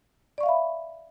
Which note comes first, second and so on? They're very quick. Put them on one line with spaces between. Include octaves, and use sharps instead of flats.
D5 C#6 F5 E5 B5